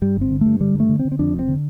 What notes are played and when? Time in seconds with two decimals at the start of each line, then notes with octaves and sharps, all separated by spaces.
0.02 G2 G3
0.17 G1 C4
0.31 D3
0.41 G2 A3
0.60 D3 G3
0.75 G2
0.80 A3
0.89 D3
0.99 C4
1.05 D3
1.12 C4
1.19 F2 D4
1.34 F1
1.39 C4
1.48 D3